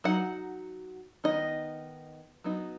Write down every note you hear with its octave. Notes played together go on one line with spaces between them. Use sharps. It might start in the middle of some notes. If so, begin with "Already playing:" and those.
F#3 D#4 F#5
D#3 B3 D#4 D#5
F#3 B3 D#4